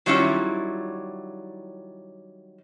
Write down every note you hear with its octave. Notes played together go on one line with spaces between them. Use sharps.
D#3 F#3 G3 C#4 E4 F4